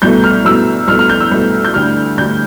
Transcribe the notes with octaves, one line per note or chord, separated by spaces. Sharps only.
C2 B2 A3 G6
F6
C2 B2 A3 E6
C2 B2 A3 F6
F6
G6
E6
C2 B2 A3
G6
D2 D3 G3 F6
D2 D3 G3 G6